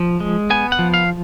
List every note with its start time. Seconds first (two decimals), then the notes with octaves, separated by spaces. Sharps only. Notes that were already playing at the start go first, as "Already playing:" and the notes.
Already playing: F3
0.20 G#3
0.50 B3 G#5
0.72 F#5
0.79 F3
0.94 F5